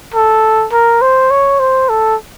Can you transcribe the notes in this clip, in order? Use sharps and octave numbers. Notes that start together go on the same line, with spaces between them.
A4
A#4
C5
C#5
C5
A4